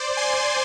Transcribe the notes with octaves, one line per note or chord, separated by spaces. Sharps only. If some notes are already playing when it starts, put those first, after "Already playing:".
Already playing: C5 D5
G#5 C6